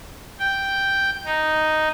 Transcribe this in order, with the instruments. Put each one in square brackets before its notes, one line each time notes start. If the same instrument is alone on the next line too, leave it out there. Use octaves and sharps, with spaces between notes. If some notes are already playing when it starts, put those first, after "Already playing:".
[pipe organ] G5
D#4